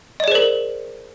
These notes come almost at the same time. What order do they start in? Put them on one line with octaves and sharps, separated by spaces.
D#5 D5 G#4 C5 A#4